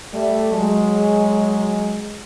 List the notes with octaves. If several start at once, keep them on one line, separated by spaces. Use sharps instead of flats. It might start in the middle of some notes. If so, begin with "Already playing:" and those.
G3 A3
F#3 G#3